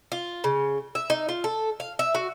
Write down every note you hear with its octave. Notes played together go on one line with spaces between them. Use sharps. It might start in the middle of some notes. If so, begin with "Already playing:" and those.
F4
C#3
E5
D#4
F4
A4
F5
E5
F#4